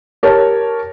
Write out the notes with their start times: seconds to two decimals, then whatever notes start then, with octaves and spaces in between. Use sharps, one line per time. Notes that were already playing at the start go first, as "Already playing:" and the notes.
0.23 G4 A#4 C#5 A5